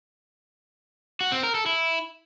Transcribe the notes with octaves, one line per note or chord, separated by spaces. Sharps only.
F#4
C4
A#4
A4
E4